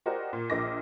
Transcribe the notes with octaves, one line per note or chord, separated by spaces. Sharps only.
F#4 G4 A#4 C5 D5 D#5
A#2
A#1 A#2 D#5 D6 A#6